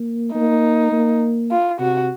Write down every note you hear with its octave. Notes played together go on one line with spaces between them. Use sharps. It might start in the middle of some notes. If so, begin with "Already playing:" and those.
Already playing: A#3
A#3 D#4
A#3
F4
C3 F#4